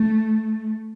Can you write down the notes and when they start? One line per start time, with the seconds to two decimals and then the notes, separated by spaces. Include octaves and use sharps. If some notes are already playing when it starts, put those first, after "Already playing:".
Already playing: A3